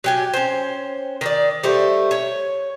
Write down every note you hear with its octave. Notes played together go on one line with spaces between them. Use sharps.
F#3 G4 G#5
C#4 C5
D#3 C5 D5
G3 A3 C5
C#5